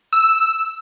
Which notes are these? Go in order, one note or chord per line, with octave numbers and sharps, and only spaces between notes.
E6